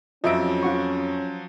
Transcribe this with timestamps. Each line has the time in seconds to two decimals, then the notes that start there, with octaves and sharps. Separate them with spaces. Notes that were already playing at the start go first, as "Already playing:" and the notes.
0.24 F2 F3 F#3 C#4 D#5 E5 D7
0.63 F4 F#5 C#6